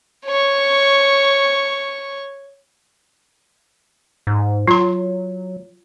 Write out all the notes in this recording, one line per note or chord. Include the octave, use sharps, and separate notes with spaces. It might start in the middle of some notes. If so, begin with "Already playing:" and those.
C#5 C#6
G#2
F#3 F4 C6